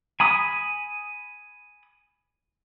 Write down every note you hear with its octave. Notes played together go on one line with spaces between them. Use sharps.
G#5 B5 D#6